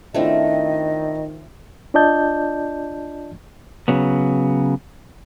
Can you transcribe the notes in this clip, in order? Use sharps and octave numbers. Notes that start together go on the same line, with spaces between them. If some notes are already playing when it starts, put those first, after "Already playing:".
D#3 A3 C4 D4 E4 F4 D#5
D4 F4 D5 D#5 A5 G6
C#3 F#3 B3